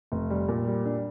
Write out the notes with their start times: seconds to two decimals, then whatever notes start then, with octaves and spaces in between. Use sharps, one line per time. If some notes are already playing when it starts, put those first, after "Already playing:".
0.12 F1
0.30 G3
0.48 A#2
0.67 G3
0.85 D4